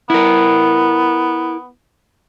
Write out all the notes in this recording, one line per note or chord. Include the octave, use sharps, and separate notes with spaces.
B3 E4 A#4